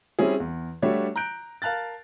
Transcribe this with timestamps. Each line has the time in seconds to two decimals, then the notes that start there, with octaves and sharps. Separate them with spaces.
0.19 G3 C4 C#4 E4 G#4
0.40 E2
0.82 G3 A3 D4 F#4 C#5 E5
1.16 A#5 F#6 G6 D7
1.62 A#4 F5 A5 F#6 A6